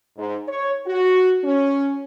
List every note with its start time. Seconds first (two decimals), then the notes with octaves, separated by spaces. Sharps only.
0.16 G#2
0.48 C#5
0.86 F#4
1.44 C#4